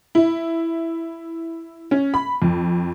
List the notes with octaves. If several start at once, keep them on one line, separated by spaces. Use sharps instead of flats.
E4
C#4
B5
F2